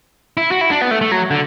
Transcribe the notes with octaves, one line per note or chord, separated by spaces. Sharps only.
E4
F#4
E4
D4
B3
A3
A3
F#3
D3